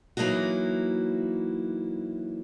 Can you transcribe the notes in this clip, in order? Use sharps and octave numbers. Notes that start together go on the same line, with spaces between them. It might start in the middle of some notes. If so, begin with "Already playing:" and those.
E3 F#3 A#3 D#4 E4 F#4